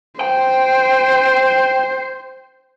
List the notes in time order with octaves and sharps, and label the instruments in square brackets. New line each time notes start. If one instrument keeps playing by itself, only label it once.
[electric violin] C5 [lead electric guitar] G5